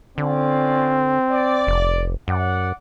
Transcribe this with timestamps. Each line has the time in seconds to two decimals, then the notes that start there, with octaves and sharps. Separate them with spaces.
0.18 D3 C4 C#4 F4 D5
1.31 D5
1.67 F1
2.28 F#2 D5 F#5